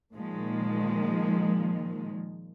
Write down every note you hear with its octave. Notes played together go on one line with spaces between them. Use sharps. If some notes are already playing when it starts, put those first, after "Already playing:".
A#2 D#3 F3 G#3